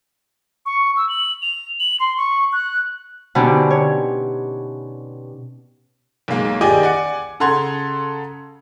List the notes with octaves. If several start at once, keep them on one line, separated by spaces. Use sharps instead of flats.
C#6
E6
F#7
F7
F#7
C6
C#6
F#6
B2 D3 C4 C#4 D#4 G4
C#5
B1 G#3 A#3
D#2 G4 G#4 D5 D#5 G#5
D5 F#5 G#5 C#7
C#3 A4 F#5 A#5 C6 G#6